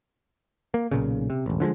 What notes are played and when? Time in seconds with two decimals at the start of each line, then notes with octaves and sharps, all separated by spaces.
0.74 A#3
0.91 B1 A#2 C#3
1.30 C3
1.46 E1 A1
1.60 D3 F3 F#3 G#3